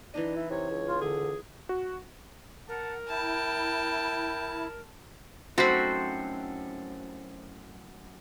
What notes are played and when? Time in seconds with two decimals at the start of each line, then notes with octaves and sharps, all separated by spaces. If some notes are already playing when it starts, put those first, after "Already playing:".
0.14 E3 D4 D#4 D#5
0.36 E4
0.50 C3 C#5
0.70 C#2
0.88 F4
1.01 D3 G#4
1.69 F#4
2.69 A#4 F#5 A5
3.08 E4 G5 A5
5.58 F#2 A2 C4 D#4 F#4 A4 C5 B5